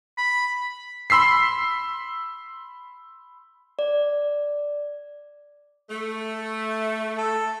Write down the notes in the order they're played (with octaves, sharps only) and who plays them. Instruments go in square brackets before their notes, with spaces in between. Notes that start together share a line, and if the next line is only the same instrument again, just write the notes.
[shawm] B5
[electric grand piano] B5 C6 E6 B6 C7
[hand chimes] D5
[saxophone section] A3
[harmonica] A4